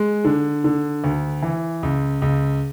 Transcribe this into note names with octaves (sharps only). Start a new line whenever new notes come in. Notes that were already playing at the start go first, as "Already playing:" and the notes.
Already playing: G#3
D3
D3
D2
E3
C#2
C#2